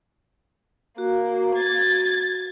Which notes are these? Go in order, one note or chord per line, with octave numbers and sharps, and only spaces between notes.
A#3 F#4
G#6 A6